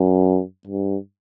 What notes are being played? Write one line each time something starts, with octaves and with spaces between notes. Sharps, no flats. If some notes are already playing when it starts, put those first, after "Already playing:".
Already playing: F#2
G2